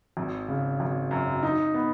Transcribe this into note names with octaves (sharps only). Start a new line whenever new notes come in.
G#1
C#3
G#1
F#2
D#4
B3